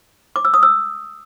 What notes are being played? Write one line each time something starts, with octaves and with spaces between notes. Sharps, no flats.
D6
E6
D#6
E6